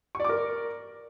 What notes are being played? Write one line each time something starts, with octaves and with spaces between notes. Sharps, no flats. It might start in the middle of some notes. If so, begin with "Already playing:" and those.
A#4 D5 C#6 D6